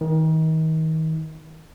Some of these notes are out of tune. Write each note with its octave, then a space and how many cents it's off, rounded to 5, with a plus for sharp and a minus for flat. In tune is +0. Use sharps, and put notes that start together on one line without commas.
D#3 +35